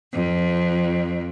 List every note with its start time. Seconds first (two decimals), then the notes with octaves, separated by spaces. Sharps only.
0.12 F2